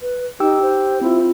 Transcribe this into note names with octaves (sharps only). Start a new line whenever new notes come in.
B4
D#4 G4 G5 E6
C5
C4 E4 F4